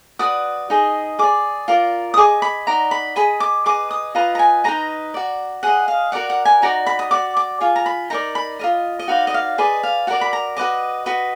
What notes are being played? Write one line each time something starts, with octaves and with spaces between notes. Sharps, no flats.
F#4 B4 D5 D#6
D#4 G#4 D#5
G#4 D5 D6
F4 A#4 D5
D#6
G#4 D#5 D6
B5
D#4 F#4 D5 A#5
B5
G#4 D#5 B5
D6
G#4 B4 D#5 D6
D#6
F4 B4 D#5 A#5
A#5
G#5
D#4 G#4 B4 D#5 A#5
F#4 D5
G#4 D#5 F#5
F5
F#4 A#4 D5 F#5
F#5
G#5
D#4 F#4 D5 A#5
B5
D#6
F#4 D5 D6
D6
F4 G#4
A#5
B5
D#4 A#4 D5 A#5
B5
F4 A#4 D#5
D#5
D#4 F#4 B4 D5 F5
D#5
F5
G#4 B4 D5 D#5
F5
F#4 A#4 D5 F#5
B5
A#5
F#4 B4 D#5 D6
F#4 B4 D#5